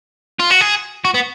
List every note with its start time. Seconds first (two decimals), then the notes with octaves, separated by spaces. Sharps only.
0.39 F4
0.50 F#4
0.61 G#4
1.05 F#4
1.14 B3